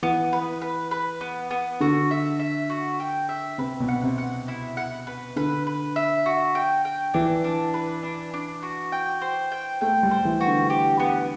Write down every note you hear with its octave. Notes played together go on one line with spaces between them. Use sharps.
E3 B3
B4
B4
B4
B3
B3
D3 F#4
E5
E5
F#4
G5
E5
C3 B4
B2
F#5
C3
F#5
E4
F#5
B4
D3 B4
B4
E5
F#4
G5
G5
E3 D4
D4
B4
D4
D4
F#4
G5
C5
G5
A3 G5
G3
C5
E3
F#4
D3
G4
B3